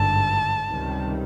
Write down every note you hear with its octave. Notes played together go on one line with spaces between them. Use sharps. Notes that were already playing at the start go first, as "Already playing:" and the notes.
Already playing: G#1 G2 D3 A5
C#2 C3 D#3 G3